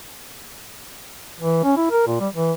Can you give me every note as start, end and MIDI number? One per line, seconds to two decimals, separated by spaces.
1.40 1.64 52
1.64 1.74 61
1.77 1.90 64
1.91 2.04 70
2.07 2.17 46
2.20 2.28 55
2.34 2.53 52